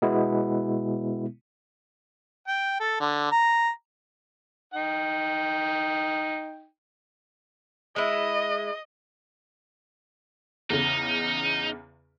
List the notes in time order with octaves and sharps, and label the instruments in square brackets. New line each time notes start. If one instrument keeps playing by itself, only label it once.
[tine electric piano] B2 G#3 B3 E4
[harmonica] G5
A4
D3
A#5
D#4 G5
[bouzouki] G#3 E4 [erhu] D#5
[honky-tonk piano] E2 C#3 [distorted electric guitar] D#4